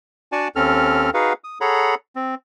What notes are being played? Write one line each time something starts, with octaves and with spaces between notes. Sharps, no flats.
D4 F#4 D5 F#5 G#5 A5
D#2 C4 C#4 A4 F6
D#4 F#4 G#4 B4 F5 F#5
D#6
G#4 A4 C#5 F#5 A#5 B5
C4